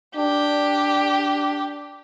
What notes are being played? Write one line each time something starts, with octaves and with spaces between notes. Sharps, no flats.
D4 G4